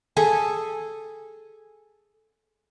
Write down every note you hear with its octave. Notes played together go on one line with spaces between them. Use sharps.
G#4 A4 G#5